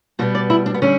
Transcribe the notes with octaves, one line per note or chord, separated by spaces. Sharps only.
B2 G3 B3 F#4
D5
E4
D4
B3
D3 G3 C#4